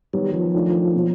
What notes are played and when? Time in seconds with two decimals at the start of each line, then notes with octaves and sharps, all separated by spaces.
0.13 D#3 F#3 G3 B3
0.34 F3
0.54 D#3 F#3 A3 D4 F4
0.95 B2 F#3 A#3